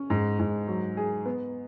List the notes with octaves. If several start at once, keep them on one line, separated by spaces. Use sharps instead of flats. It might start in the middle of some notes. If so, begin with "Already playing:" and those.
Already playing: C#4
G#2
G#2
F#3
G#4
B3